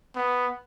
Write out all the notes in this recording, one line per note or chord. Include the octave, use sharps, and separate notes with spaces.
B3